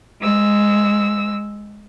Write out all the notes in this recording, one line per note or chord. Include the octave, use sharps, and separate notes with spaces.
G#3 E6